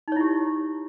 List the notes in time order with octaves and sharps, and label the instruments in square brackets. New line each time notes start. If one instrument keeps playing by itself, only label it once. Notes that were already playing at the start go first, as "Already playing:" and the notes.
[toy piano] D#4
C#5
E4
G4